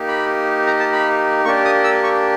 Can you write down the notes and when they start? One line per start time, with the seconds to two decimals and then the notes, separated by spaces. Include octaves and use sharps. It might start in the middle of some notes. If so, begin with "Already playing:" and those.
Already playing: A#3 D#4 G4
0.08 B5
0.67 A#5
0.80 A5
0.93 B5
1.45 A#3 D4 G4 C#6
1.65 D#6
1.84 E6
2.03 C#6